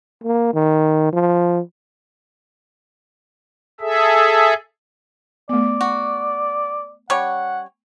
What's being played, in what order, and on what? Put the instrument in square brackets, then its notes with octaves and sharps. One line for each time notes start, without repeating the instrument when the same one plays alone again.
[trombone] A#3
D#3
F3
[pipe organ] G#4 A4 E5
[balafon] A3 B3 [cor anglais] D5
[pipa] F#4
[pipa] G3 C#4 C#5 [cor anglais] F#5